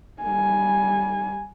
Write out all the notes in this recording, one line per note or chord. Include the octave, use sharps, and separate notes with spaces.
G3 G#5